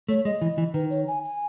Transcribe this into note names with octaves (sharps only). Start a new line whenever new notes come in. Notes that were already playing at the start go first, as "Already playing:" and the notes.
A3 C#5
G#3 D#5
E3
E3
D#3 B4
C#5
G#5
G#5